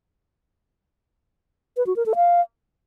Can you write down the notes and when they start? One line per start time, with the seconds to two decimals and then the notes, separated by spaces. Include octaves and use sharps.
1.77 B4
1.87 F#4
1.96 A#4
2.06 A4
2.16 F5